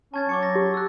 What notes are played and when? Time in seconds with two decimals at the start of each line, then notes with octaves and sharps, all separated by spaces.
0.14 C#4 A5 G#6 A6
0.29 F#3 C#6 D6 C#7
0.42 A6 A#6
0.55 G4
0.74 E6 F#6